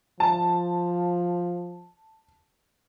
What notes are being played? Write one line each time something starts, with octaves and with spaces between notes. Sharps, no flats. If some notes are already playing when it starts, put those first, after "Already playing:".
F3 A5